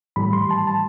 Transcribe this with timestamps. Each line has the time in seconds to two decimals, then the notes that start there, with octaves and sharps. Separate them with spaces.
0.16 A2 E3 G3 B5
0.33 C6
0.51 A5
0.67 A5